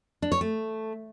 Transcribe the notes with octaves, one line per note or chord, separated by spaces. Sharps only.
D4
C#5
A3